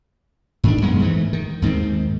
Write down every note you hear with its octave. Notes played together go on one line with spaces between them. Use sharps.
G#2 D#3 D4
B1 F#2 G#3 B3
G#2 E3 A3
D#3
D#2 G#2 D#3 C4